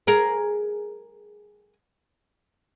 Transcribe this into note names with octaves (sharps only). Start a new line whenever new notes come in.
G#4 A#4